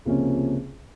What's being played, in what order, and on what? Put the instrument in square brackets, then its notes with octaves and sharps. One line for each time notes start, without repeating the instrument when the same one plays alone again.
[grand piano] C#2 C3 F3 A#3 C#4